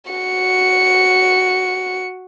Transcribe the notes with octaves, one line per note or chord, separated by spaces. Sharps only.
F#4 C#7